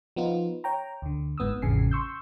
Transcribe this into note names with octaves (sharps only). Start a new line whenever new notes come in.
F3 B3 D#4 F4
C#5 G5 A#5
D2 D3
G1 G#2 B3 D#6 E6
A1 F2 C#3 G#5 C7
C6 C#6 E6 G6